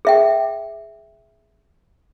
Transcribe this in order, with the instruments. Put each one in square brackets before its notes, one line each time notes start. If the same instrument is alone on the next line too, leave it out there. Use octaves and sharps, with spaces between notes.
[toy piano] G#4 E5 G5